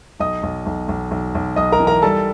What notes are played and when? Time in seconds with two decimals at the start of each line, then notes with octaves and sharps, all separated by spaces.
0.20 B1 D#5 D#6
0.43 B1
0.66 B1
0.88 B1
1.11 B1
1.35 B1
1.56 B1 D#5 D#6
1.72 A#4 A#5
1.80 E3
1.87 A#4 A#5
2.02 G3 A4 A5